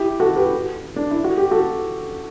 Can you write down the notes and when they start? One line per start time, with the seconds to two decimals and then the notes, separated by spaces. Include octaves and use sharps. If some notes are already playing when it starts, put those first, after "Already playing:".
Already playing: E4 G4
0.20 F#4 A4
0.36 G4 B4
0.96 D4
1.11 E4
1.24 F#4
1.38 G4
1.51 F#4 A4